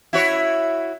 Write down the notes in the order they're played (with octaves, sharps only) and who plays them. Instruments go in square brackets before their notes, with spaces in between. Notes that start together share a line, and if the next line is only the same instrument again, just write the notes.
[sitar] E4 F#4 C#5